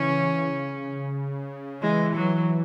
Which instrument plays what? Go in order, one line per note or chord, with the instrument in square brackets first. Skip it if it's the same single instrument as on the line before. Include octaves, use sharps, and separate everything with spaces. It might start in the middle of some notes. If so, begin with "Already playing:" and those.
Already playing: [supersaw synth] C#3 E3 [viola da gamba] C#4
[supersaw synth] E3 [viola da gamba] G#3
[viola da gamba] F#3